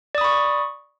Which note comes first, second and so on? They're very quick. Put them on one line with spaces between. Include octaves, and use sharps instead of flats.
D5 D#6 B5 C#6